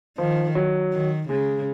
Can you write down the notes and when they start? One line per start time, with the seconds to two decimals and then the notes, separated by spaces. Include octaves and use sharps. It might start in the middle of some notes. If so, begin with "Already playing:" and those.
0.18 D#3 F3
0.55 F#3
0.93 D#3
1.29 C#3 G#3